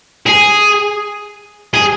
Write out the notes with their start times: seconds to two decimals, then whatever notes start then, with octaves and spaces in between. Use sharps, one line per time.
0.26 G#4
1.74 G#4